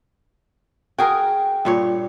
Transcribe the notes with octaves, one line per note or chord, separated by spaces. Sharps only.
F#4 G#4 A#4 G5
G2 A#2 C#5